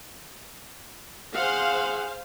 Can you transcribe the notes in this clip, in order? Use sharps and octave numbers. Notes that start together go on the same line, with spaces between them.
G#4 C5 F5 F#5